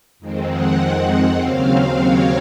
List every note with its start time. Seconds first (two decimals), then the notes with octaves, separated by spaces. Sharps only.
0.19 F2 D#3 G#3 C4
0.48 F#5
1.38 D#2 C#3 F#3 C4 F5
1.98 C#5